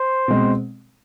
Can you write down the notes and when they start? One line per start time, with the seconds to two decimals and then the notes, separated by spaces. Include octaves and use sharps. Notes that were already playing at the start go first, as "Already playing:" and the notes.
Already playing: C5
0.28 B2 G#3 C4